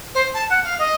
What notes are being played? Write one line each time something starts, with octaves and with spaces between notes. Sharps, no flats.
C5
A5
F#5
F5
D#5